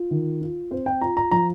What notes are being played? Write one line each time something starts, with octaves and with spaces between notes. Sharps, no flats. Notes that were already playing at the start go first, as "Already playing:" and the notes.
Already playing: F4
D#3
F4
C4 C5
G5
F4 A#5
A#5
F3 A#5